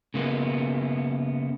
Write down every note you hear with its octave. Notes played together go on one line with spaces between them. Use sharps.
C#3 A#3 B3